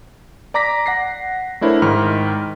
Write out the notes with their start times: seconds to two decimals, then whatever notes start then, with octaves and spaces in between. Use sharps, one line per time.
0.54 D5 A#5 D6 A#6 B6
0.86 F#5 A#6 C7
1.61 A3 D4 E4 A#4 C5 C#5
1.82 G#2 D#3 E4 F6